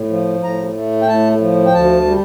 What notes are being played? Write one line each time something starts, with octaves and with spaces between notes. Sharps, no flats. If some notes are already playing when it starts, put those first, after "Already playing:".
Already playing: A2
F3
A2 A#5
A3
G5
A2 A5
F3
G5
D2 A5
G3